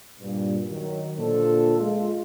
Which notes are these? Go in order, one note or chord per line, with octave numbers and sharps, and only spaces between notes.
G2 A#2
D#3 F#3
A#2 D3 F3 D4 F4 A4
G#3 F4